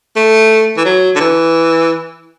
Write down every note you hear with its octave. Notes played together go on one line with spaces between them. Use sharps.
A3
E3
F#3
D3
E3